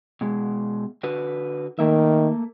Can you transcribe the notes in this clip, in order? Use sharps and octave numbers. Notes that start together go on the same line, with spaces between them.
B2 G#3
D3 F#4 B4
D#3 A3 A#3 E5